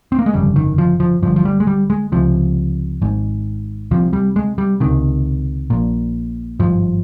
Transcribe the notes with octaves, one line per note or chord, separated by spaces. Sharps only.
C4
A#3
G#3
G1 F2 C#3 G3
D#3
F3
F3
G1 G2 F3
F3
G3
G#3
G3
G#3
C#2 C3 F3
G#1 G#2
C2 C3 F3
G3
G#3
G3
C#2 C3 D#3
A#1 A#2
G#1 G2 F3